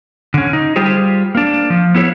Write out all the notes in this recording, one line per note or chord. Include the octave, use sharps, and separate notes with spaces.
D3 C#4
D#4
G3 F4 G4 G#4 C5
A#3 D4
F3
B3 E4 G#4 C#5